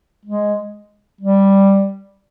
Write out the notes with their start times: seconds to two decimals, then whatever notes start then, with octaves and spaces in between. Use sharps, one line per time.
0.25 G#3
1.21 G3